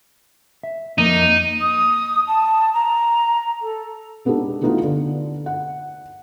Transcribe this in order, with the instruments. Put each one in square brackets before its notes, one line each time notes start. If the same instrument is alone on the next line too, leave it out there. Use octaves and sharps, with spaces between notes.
[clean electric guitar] E5
[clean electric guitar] F2 A#3 [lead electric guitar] D#4
[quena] D#6
A5
A#5
A4
[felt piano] G#3 B3 D4 D#4 G4 A4
E3 A3 B3 D#4 F4 F#4
D3
F#5